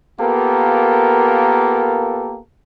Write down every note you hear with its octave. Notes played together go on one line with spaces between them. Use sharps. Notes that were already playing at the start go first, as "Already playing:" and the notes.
A#3 B3 F4 G4 A4 A#4